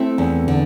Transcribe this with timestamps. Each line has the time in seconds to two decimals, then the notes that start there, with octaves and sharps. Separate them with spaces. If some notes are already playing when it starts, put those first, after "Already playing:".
Already playing: A3 C4 E4
0.18 E2
0.48 D3